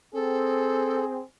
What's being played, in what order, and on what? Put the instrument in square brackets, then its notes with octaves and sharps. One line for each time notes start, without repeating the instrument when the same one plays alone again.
[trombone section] C4 G#4 [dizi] A4